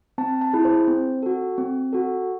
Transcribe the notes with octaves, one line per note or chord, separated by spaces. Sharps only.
C4 A5
A5
E4 G#4
C5
C4
F#4 A4
C4
F#4 A4